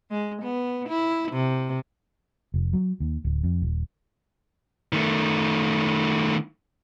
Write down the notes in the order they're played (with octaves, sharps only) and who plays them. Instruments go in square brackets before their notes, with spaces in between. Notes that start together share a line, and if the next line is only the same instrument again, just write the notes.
[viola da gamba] G#3
B3
E4
C3
[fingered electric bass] F1
F#3
D#2
D1
F2
D#1
[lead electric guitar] D#3 A3